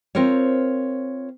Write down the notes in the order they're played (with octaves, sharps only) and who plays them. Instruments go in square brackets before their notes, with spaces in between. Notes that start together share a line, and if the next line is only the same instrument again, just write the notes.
[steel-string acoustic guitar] C4 F4 A#4 C5 C#5